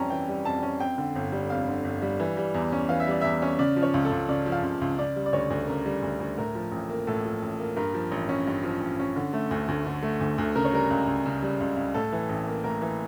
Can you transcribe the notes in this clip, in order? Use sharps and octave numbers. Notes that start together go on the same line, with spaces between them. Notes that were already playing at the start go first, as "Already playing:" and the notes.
Already playing: F2 E3 G3 C#4 G5 A5 A#5
E3 G5
G3
F2 A5
C#4
F2 G5
D3
G1
G3
F2 F5
D3
G1
G3
E3
G3
E2
C#4
E3 F5
E5
G3 D5
E2 E5
C#4
C#3 D5
F3
C#5
C#2
A4
C#2
C#3 D5
F3
F5
C#2
C#2
C#3 D5
G3
D5
D2 C#5
D2
C#3 A#4
G3
D2
D2
A2 A#4
F3
A1
A#3
A2 A4
F3
A1
A#3
G2 A#4
F3
A1
C#4
G2
F3
A1
C#4
D3
A3
D2
D2
D3
A3
D2
D2
C#3 A#4
C#5
G3 A#4
C#2
C#2
C#3
G3
C#2
C#2
A2 A4
E3
A1
A#3
A2 A#4
E3